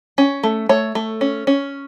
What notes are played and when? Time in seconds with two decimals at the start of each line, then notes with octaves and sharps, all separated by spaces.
0.18 C#4
0.43 A3
0.69 A3 C#5
0.95 A3
1.21 C#4
1.47 C#4